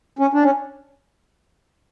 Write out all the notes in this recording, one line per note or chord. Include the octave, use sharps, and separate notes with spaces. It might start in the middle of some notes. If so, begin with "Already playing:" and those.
C#4
D4
C#4